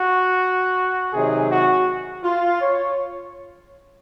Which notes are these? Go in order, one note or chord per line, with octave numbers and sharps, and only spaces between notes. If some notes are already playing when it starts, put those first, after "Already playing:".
Already playing: F#4
C3 D#3 F#3 G#4
F#4
F4
C#5